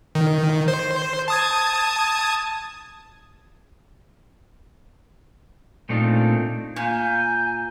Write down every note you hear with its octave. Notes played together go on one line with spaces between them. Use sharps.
D#3
C5
A5 D#6 G#6
A#2 A3 C4 D4 D#4 F4
A#2 G#5 G6